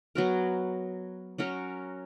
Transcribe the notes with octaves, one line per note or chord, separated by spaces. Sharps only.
F#3 B3 F#4 A#4
F#3 C#4 F#4 A#4